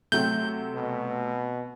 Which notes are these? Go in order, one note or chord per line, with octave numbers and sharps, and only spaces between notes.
C3 F#3 A3 C4 G6
B2